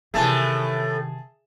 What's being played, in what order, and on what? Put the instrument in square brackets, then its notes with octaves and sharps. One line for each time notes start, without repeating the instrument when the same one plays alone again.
[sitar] A2 E3 A3 [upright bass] C3 D#3 [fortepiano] G#4 E5 A5